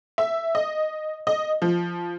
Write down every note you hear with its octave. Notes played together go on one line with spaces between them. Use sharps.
E5
D#5
D#5
F3